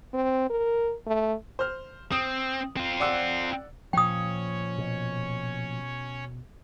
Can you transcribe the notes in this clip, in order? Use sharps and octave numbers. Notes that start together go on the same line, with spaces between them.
C4
A#4
A3
C5 F6
C4 D#6
C4 F4
D5 F#5 E6
A#2 F3 C#4 C#5 G5 D#6
B2